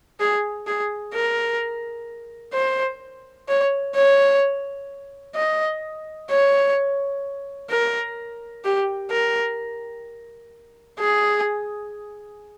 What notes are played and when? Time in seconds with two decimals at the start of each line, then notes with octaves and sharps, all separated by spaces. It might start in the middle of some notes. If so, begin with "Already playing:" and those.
0.20 G#4
0.67 G#4
1.14 A#4
2.54 C5
3.49 C#5
3.95 C#5
5.36 D#5
6.30 C#5
7.70 A#4
8.65 G4
9.11 A#4
10.99 G#4